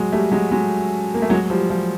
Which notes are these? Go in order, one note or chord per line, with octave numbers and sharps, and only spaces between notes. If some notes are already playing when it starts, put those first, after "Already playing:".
Already playing: F#3 G#3
G3 A3
F#3 G#3
F#3 G#3
A#3
A3
F#3 G#3
F3 G3
F3 G3